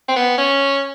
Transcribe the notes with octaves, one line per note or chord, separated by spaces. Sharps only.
C4
B3
C#4